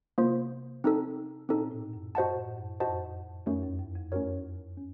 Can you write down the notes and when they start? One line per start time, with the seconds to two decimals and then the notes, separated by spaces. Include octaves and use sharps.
0.18 C3 A#3 F4 C5
0.84 C4 D#4 A4
1.49 A#2 C4 D#4 A4
1.71 A2
1.93 F#2
2.15 F#2 F#4 C5 D#5 F#5 A5
2.36 A2
2.58 F#2
2.80 F2 F#4 C5 D#5 F#5 A5
3.46 F2 A3 C#4 F#4 A#4 C#5
3.63 F#2
3.79 F#2
3.96 F2
4.12 F#2 A3 C#4 F#4 A#4 C#5
4.77 C#4